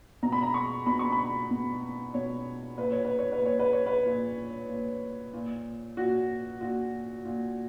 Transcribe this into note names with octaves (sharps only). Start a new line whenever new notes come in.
B2 A#5
B5
A#5
C#6
B2 B5
C#6
B5
B2
B2 C#5
A#2 B4
C#5
B4
C#5
B4
A#2 C#5
B4
C#5
B4
A#2
A#2
A#2
A#2 F#4
A#2 F#4
A#2